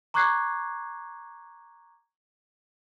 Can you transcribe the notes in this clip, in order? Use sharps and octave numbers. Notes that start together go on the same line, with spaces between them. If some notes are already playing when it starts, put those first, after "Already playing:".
A#5 C#6 D6 F#6 G#6 C7